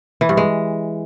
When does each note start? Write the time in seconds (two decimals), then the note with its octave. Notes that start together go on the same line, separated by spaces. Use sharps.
0.21 E3
0.29 G2
0.37 G#3